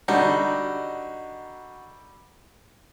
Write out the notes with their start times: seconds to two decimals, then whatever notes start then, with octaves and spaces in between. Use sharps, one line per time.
0.08 D3 G3 D#4 F#4 F#5